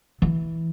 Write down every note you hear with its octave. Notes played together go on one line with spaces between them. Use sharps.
E3